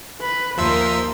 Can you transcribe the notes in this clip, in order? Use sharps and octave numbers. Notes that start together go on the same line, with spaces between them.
B4
D#2 F3 A#4 C5 D#5 E5 E6